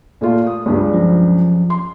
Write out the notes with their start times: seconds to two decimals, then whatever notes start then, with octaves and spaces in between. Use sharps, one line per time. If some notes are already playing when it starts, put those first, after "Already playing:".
0.21 A#2 A3 F4
0.47 D#6
0.66 C#2 G2
0.94 F3 F#3 C#4
1.70 C6